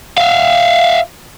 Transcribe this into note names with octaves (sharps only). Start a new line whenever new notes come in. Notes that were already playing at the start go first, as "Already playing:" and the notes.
E5 F5